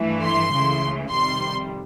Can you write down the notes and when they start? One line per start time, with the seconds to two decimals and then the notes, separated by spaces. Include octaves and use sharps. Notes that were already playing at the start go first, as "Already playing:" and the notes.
Already playing: G2 E3 A3
0.23 C6
0.52 C#2 C#3 E3 A3
1.10 F2 C3 D#3 G3 C6